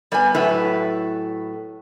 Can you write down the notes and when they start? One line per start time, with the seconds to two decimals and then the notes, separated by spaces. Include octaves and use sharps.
0.12 G3 B3 B4 G#5
0.35 A2 F#3 A3 E4 B4